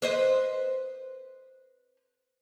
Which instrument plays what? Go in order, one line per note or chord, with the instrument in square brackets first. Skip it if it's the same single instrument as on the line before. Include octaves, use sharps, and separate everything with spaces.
[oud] B4 C5 D#5